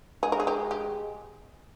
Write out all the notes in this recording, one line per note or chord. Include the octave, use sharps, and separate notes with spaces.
G#3 G#4
A#4
G#4
G4
G4